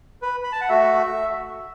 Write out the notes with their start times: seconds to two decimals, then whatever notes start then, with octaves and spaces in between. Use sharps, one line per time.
0.22 B4
0.44 B5
0.52 A5
0.61 F#5
0.69 A3 F#4 E5